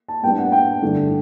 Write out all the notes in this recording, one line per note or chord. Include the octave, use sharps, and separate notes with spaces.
A5
A2 G3 B3 D4 G5
F#5
G5
G2 D3 A3 D4